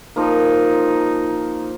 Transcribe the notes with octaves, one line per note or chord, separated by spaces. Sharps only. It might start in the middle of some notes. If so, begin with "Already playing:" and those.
F3 A#3 D#4